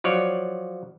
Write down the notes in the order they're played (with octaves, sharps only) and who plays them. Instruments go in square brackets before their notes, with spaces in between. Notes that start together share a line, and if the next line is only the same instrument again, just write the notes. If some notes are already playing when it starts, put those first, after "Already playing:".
[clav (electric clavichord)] F3 F#3 C#5 D5